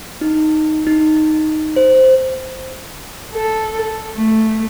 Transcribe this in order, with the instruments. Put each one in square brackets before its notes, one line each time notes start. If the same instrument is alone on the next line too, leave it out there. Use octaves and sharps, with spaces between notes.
[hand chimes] D#4
D#4
C5
[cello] A4
A3